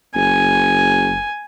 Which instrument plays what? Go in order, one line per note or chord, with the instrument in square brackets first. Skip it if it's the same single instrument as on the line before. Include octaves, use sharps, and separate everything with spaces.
[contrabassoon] F#1 [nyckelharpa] G#5